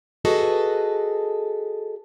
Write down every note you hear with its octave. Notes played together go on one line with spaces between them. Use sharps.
F#4 G#4 A4 B4 D#5